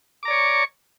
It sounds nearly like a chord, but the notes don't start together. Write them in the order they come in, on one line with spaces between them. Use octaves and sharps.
D6 A#5 D5 C#5 C#6